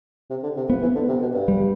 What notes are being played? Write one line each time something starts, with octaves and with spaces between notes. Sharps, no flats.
C3
D3
C3
F3 B3
E3
D3
C3
B2
G2
G3